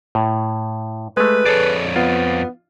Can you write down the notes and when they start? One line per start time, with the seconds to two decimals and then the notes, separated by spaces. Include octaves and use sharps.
0.15 A2
1.17 G#3 A3 B4
1.46 F2 G#4 A4 C#5 D5
1.96 B3 F4